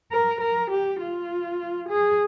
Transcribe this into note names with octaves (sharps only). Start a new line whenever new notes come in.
A#4
A#4
G4
F4
G#4